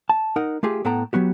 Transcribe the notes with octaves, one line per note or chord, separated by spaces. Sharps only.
A5
D#4 A#4 D#5 F#5
A3 F4 G4 G#4
A2 B3 A4 F#5 G5 A#5
F#3 B3 F#4 G4